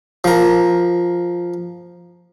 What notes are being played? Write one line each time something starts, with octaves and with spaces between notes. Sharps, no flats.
F3 A#4